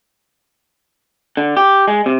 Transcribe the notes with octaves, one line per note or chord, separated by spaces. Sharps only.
D3
G4
G#3
C3